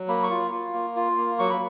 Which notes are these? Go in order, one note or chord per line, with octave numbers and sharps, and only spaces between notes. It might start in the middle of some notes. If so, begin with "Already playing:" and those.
Already playing: F#3
A#3 B5
C#6
F4
F4
A#3
F4
A#3
F#3 C#6
B5